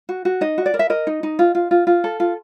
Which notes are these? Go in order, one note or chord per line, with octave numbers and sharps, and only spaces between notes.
F#4
F#4
D#4 D#5
F#4
D5
A#4
E5
A#4 D#5
D#4
D#4
F4
F4
F4
F4
A4
F4